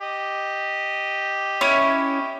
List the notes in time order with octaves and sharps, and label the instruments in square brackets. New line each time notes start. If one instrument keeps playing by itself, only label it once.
[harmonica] G4 D#5
[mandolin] C#4 E4 C#5